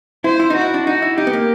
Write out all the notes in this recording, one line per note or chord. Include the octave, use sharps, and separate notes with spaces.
E4 C5
E4
D#4
F#4
E4
D4
D#4 F#4
E4
D#4 G4
B3
A#3